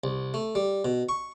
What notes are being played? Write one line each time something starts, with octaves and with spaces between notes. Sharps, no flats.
C2
A3
G3
B2
C#6